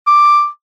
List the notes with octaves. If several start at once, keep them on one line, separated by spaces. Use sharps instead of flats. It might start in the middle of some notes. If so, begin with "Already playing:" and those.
D6